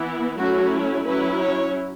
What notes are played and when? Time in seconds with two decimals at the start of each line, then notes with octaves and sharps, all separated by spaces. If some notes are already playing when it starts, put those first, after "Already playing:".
Already playing: E3 B3 E4
0.38 F#3 A3 C#4 E4 F#4
1.06 F#3 C#4 E4 B4
1.41 C#5